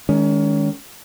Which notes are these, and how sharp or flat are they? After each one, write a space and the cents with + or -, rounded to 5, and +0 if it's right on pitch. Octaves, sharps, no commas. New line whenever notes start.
D#3 +0 G#3 +0 C#4 +30